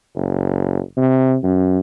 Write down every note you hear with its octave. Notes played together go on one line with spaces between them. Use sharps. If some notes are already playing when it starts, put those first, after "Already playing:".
F#1
C3
F#2